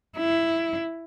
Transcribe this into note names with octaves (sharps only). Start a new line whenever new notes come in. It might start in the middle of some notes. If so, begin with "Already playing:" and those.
E4